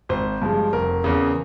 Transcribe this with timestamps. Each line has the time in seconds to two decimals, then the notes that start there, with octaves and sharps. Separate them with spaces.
0.09 G#1 C5
0.42 G2 F3 G#3
0.73 F1 A#4
1.04 E2 C#3